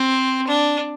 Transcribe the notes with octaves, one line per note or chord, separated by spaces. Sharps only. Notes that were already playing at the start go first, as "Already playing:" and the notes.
Already playing: C4
D4